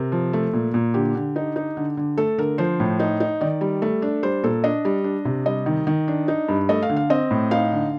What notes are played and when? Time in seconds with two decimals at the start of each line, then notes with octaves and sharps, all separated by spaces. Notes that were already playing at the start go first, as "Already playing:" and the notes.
Already playing: C3 A#4
0.12 F3
0.33 A3
0.53 A#2
0.74 A#2
0.94 D3 G4
1.15 D3
1.36 D#4
1.56 D#4
1.77 D3
1.97 D3
2.18 A3 A4
2.38 D3 A#4
2.58 F3 C5
2.80 A2
3.00 D#4
3.20 D#4
3.41 D#3 D5
3.61 G3
3.82 A3
4.02 D4
4.23 G3 C5
4.43 A#2 A4
4.64 D4 D#5
4.85 G3
5.04 D4
5.25 C3
5.46 G3 D#5
5.66 D#3
5.87 D#3
6.08 D4
6.28 D#4
6.49 G2
6.69 A3 D#5
6.82 F5
6.89 D3
6.96 F5
7.10 C4 D#5
7.31 A2
7.51 D#4 F5
7.72 D3